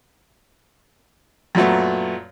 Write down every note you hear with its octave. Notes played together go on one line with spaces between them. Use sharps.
F#2 A#2 F#3 A3 B3